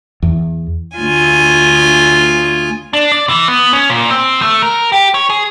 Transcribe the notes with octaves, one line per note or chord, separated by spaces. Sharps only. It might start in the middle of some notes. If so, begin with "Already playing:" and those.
E2
D2 F4 G#5
D4
D5
E3
B3
C#4
A#2
C4
A3
A#4
G4
C#5
G#4